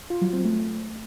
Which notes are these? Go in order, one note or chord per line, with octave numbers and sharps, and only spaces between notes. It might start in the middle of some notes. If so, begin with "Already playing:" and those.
F4
F#3
C4
A3